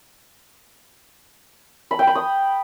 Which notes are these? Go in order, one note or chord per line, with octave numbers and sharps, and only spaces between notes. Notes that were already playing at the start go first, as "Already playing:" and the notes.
B5
G5
B5
D#6